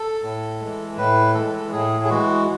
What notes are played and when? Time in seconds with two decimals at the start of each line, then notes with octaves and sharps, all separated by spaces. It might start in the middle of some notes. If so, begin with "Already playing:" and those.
Already playing: A4
0.23 A2
0.60 E3 G#3
0.98 A2 B4
1.35 E3 G#3 A4
1.72 A2 G#4
2.04 G#4
2.09 E3 G#3 F#4